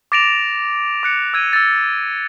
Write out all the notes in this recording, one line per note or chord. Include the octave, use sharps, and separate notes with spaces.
D6 A6 A#6 D7 E7 F7
D6 F#6 C#7
E6 G#6 D#7
E6 A6